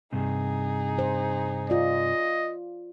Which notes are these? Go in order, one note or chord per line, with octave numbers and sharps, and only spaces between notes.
G2 C3 D#4 G#4
C5
F4 D5 D#5